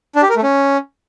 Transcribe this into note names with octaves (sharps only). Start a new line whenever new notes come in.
D4
G4
A#4
A3
C#4